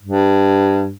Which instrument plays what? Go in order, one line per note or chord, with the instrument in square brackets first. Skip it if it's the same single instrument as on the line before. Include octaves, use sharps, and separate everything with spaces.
[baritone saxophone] G2